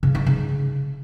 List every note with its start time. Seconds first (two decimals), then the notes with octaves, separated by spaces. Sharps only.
0.03 C#3
0.15 D#4
0.26 C#3